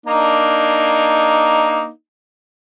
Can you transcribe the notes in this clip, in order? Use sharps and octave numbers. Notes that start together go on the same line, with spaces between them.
A#3 D4 D#4